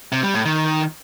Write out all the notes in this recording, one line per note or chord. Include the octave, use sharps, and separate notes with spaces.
C3
G3
A2
D#3